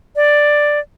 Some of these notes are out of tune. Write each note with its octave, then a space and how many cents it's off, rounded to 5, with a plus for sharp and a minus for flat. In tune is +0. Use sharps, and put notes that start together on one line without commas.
D5 +5